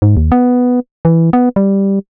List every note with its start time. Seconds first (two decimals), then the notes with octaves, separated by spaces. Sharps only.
0.02 G#2
0.17 D#2
0.32 B3
1.05 E3
1.33 B3
1.56 G3